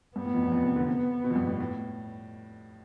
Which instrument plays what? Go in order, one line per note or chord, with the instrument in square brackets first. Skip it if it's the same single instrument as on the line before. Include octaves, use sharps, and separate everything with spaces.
[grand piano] G2 [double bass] B3
[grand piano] A2
F2
E2
F2
C3
D3
[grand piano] C3 [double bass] B3
[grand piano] B2
F2
G2
A2
A2